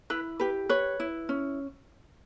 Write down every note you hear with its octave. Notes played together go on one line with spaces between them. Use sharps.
E4 B4
G4 B4
B4 C#5
E4
C#4